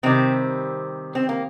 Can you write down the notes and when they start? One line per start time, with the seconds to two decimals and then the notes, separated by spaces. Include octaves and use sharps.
0.03 C3 D#3 G3 C4
1.15 C4
1.29 A#3